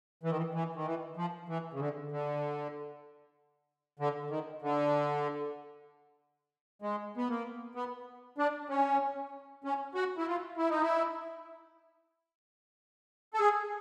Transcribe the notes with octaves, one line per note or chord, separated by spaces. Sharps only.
E3
D#3
E3
E3
D#3
E3
F3
E3
C#3
D3
D3
D3
D#3
D3
G#3
B3
A#3
B3
D4
C#4
C#4
F#4
E4
F4
E4
D#4
E4
A4
G#4